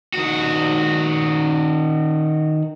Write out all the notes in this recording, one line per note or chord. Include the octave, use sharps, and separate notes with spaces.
D#3 F#4